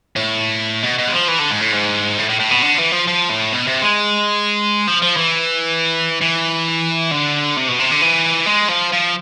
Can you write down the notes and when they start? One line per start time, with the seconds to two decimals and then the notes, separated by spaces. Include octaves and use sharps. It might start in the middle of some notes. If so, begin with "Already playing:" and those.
0.16 A2
0.83 B2
0.98 B2
1.08 G#3
1.12 F3
1.28 E3
1.39 D3
1.50 G#2
1.61 A2
1.73 G#2
2.18 A2
2.29 A2
2.40 A2
2.51 B2
2.62 D3
2.78 E3
2.92 F3
3.07 F3
3.29 A2
3.52 B2
3.67 C3
3.82 G#3
4.87 F3
5.02 F3
5.17 E3
6.21 E3
7.11 D3
7.57 C3
7.68 B2
7.79 C3
7.91 D3
8.01 E3
8.46 G#3
8.69 F3
8.92 F3